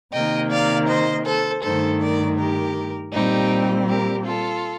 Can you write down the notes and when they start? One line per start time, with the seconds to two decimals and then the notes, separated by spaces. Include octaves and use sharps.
0.13 C3 D#3 A#3 D#5 G5
0.50 D5 F5
0.87 C5 D#5
1.25 A4 C5
1.63 G2 D#3 A3 A4 C5
2.01 A#4 D5
2.38 G4 A#4
3.13 A#2 G3 C4 D#4 G4
3.88 G4 A#4
4.26 F4 A4